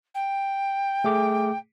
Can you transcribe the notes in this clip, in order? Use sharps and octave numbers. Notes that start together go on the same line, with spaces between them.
G5
A3 G#4 D6